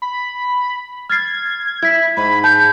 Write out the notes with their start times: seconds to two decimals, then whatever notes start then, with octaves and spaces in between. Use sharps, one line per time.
0.02 B5
1.10 F6 G#6 A6 C7
1.83 E4 G#6 B6
2.17 G#2 B5
2.44 A5 G6